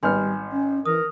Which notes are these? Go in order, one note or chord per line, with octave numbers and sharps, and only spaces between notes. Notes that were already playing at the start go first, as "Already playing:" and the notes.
G#1 G3 B3 G#5 C6 F6 G6
C#4
E3 A#4 D#6